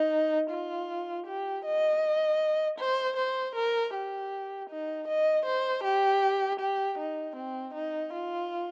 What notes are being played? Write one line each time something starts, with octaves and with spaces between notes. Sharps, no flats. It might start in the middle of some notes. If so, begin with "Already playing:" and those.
Already playing: D#4
F4
G4
D#5
C5
C5
A#4
G4
D#4
D#5
C5
G4
G4
D#4
C4
D#4
F4